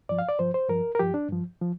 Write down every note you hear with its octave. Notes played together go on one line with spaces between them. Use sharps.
G2 F3 D5
F5
D5
G2 F3 C5
C5
G2 F3 A#4
A#4
G2 F3 G4
D4
G2 F3
F3